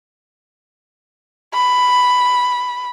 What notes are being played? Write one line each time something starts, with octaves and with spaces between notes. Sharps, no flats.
B5